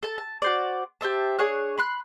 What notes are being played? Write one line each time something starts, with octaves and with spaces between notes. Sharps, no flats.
A4 A5
A5
F#4 C5 D5
G4 C5 E5 A5
D4 G#4 C#5 F#6
B5 C6 F#6